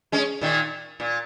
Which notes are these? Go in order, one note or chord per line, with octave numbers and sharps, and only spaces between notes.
G#3 C#4
A#2 D#3
A#2